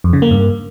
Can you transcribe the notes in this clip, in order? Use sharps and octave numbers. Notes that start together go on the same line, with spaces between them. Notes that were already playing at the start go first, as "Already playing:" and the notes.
F2
C#3
A#3
G2